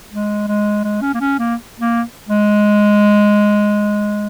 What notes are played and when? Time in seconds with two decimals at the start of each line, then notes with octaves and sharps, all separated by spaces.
0.12 G#3
0.48 G#3
0.84 G#3
1.02 C#4
1.14 A#3
1.21 C#4
1.39 A#3
1.80 A#3
2.29 G#3